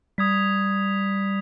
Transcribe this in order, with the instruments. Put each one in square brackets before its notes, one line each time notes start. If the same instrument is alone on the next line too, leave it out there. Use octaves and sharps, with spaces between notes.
[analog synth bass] G3 [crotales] D#6 G#6 B6